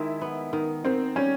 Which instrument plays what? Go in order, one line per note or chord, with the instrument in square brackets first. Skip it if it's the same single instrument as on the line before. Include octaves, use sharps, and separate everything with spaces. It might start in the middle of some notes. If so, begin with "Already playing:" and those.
Already playing: [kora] D#3 G#3 [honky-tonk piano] E4
[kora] B3
D#3
[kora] D#3 [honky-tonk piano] C4
[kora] G3 [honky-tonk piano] C#4